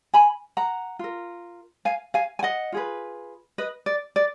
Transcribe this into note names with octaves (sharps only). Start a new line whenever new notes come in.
G#5 B5
F#5 A#5
F4 A#4
F5 G#5
F5 G#5
G#5
D#5 F#5
F4 G#4 B4
B4 D#5
D5
D5